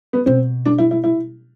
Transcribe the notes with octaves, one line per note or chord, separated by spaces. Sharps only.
B3
B2 C4
D4
E4
E4
E4